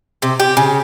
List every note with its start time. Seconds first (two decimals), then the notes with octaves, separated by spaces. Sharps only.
0.22 C3
0.40 G4
0.57 C#3